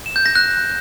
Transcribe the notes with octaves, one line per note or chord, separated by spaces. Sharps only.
E7
G6
A#6
F#6